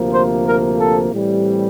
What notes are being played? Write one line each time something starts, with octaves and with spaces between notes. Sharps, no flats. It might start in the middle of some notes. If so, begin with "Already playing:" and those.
Already playing: D2 C3 F3 A#3
C5
A#4
A4
A2 E3 G3 C4